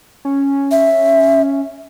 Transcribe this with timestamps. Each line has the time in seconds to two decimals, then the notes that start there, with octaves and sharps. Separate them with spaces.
0.25 C#4
0.72 E5